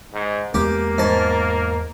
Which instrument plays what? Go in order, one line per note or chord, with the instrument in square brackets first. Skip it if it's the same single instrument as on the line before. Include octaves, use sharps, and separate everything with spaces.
[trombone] G#2
[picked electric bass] E2 G#3 B3 [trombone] A#3 [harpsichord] G4
[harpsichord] G#2 A5